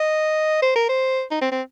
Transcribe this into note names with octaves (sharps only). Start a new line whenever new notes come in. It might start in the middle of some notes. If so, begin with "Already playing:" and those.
Already playing: D#5
C5
A#4
C5
D#4
C4
C4